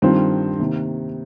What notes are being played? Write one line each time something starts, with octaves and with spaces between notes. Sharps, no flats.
G2 D#3 C4 F4 C5
C3 D#3 A#3